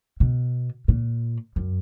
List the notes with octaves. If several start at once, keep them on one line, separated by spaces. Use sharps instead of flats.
B2
A#2
F#2